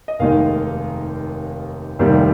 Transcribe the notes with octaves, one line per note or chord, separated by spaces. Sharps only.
D#5
F1 D#2 D#3 G#3 D#4 F5
F1 D#2 D#3 G3